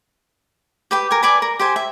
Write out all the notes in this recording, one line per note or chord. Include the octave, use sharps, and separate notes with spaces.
G4 B4 G5
A#4 G#5
B4 D5 G#5 A5
A#4
G4 C5 G#5
E5